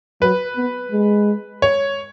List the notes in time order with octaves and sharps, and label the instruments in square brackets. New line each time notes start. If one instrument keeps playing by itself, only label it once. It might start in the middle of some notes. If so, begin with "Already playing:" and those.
[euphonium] F#3 [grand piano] B4
[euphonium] B3
G#3
[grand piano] C#5